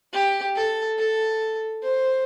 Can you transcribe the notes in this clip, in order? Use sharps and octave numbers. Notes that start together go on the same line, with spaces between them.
G4
A4
A4
C5